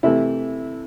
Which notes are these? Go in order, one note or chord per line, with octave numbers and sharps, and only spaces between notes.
C3 E3 A3 E4